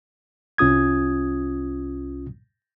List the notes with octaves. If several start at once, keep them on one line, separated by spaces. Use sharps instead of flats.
C2 C#4 F4 D#6 G#6